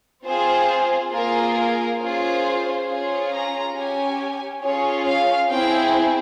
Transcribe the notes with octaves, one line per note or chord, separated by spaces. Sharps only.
C4 F4 G#4 C5
A#3 F4 G#4 A#4
A#4
C#4 F4 G#4 C5
C#4 F4 G#4
A#5
C#4 G4 G#5
C#4 F4 G#4 C#5
F5
C4 E4 G#4 G5